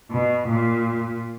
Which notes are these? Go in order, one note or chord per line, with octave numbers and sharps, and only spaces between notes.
B2
A#2